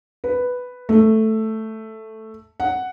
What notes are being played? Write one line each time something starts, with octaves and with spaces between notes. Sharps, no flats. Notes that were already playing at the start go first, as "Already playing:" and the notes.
B4
A3
F#5